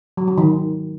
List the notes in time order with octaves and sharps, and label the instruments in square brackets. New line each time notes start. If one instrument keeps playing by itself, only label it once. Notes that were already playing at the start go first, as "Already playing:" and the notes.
[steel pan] F#3
F#3
D#3